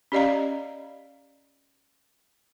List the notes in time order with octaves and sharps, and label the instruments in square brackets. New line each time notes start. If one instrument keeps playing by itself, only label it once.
[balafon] C#4 G4 D5 D#5 F5 A#5